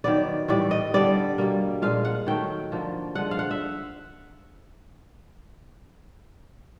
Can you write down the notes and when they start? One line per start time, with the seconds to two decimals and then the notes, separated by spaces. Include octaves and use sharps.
0.04 D#3 F#3 B3 D5
0.48 A2 E3 G3 B3 D5
0.71 D#5
0.94 D3 G3 B3 D5
1.38 B2 G3 A#3
1.82 A#2 F3 G#3 F5
2.05 F#5
2.26 D#3 F#3 A3 G5
2.72 D3 F3 A#3
3.15 D3 F3 G#3 F#5
3.31 F5
3.39 F#5
3.51 E5